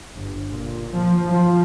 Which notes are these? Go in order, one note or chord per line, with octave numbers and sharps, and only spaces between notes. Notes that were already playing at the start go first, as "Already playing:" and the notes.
G1
A#2
F3
F3